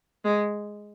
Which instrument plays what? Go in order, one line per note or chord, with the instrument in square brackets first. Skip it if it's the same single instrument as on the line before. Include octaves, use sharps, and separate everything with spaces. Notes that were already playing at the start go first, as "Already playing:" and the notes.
[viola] G#3